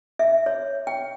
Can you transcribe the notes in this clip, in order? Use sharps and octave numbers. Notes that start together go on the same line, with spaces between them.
E5
C#5
G5